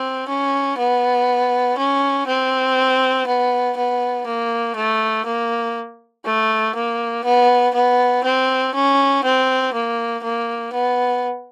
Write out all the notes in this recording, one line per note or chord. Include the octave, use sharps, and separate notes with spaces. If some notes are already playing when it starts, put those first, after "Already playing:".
Already playing: C4
C#4
B3
C#4
C4
B3
B3
A#3
A3
A#3
A3
A#3
B3
B3
C4
C#4
C4
A#3
A#3
B3